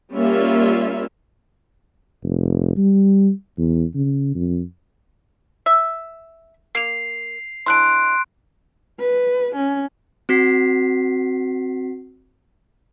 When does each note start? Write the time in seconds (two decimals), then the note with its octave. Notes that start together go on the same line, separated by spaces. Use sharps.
0.13 G3 A#3 C#4 F4 E5
2.24 F1
2.77 G3
3.58 E2
3.95 C#3
4.35 F2
5.66 E5
6.75 A#3 C7 F7
7.66 E3 D4 C6 F#6 D7
9.00 B4
9.55 C#4
10.29 C4 F#4 B6 C7